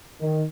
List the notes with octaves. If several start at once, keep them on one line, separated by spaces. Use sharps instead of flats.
D#3